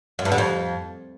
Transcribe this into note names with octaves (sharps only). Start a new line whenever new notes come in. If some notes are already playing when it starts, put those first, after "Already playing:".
F#2
G2
D3
F2